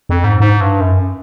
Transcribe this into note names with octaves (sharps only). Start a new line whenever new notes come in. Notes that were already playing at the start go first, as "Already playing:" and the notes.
F2
G#2
G#2
G2
F#2